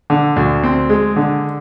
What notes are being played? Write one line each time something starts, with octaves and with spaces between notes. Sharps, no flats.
D3
D2
C4
G#3
D3